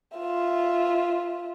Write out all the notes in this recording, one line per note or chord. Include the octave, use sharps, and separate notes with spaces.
F4 E5